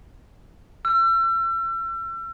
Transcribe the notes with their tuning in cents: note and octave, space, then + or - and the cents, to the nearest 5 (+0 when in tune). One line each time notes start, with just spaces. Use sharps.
E6 +40